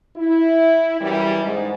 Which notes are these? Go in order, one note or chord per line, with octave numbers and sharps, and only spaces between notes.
E4
F#2 E3 G3
G#2